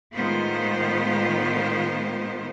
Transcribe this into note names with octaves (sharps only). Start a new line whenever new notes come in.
A2 D#3 G#3 B3 F4 C5